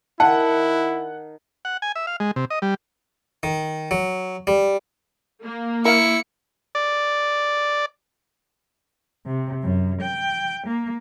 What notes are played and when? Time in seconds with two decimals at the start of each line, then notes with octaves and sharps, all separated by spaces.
0.20 D#3 E4 F#5 A5
1.65 F#5
1.82 G#5
1.96 E5
2.07 F5
2.20 G#3
2.36 C3
2.50 D#5
2.62 G3
3.43 D#3
3.91 F#3
4.47 G3
5.43 A#3
5.85 E4 A#4 F5 C#7
6.75 D5
9.25 C3
9.63 F#2
10.01 G5
10.66 A#3